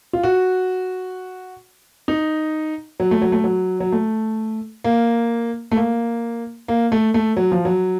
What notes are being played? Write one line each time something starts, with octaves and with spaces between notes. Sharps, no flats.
F4
F#4
D#4
F#3
A3
F#3
A3
F#3
F#3
A3
A#3
A3
A#3
A#3
A3
A3
F#3
F3
F#3